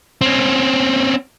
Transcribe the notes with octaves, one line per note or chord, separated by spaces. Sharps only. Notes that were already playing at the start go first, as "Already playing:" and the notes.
C4 C#4